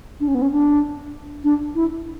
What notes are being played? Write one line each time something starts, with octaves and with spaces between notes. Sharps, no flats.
D4
C#4
B3
C#4
D4
D4
E4